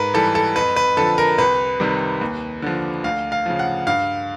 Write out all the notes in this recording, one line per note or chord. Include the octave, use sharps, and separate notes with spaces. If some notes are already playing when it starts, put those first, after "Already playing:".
Already playing: G#2 A#4 B4
E3 G3 A4
A4
F2 B4
B4
D3 F3 A4
A#4
C2 B4
C3 D#3 G3
D#2
D3 F3
D2 F5
F5
C#3 F3
F#5
G2 F5